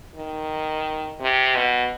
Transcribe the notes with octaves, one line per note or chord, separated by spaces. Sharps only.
D#3
C3
B2